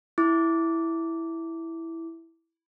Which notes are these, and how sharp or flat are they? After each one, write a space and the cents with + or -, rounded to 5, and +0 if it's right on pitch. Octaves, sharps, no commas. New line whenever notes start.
E4 +0 D6 -15